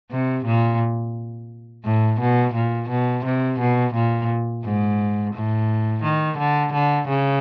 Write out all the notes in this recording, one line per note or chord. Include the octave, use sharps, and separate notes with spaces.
C3
A#2
A2
B2
A#2
B2
C3
B2
A#2
G#2
A2
D#3
D3
D3
C#3